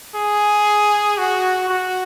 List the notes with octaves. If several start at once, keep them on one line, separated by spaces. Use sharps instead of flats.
G#4
F#4
F#4